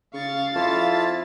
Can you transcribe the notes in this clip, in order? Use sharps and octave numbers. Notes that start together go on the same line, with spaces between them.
C#3 F5 C#6 A6
F2 E4 F4 A5